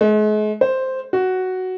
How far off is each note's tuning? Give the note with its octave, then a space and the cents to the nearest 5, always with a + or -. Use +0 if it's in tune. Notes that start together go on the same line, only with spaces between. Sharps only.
G#3 +40
C5 +0
F#4 +5